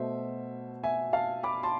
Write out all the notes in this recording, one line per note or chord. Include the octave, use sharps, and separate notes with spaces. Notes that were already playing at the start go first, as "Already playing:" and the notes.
Already playing: B2 A3 C5 E5
E5 G#5
F5 A5
B5 D6
A5 C6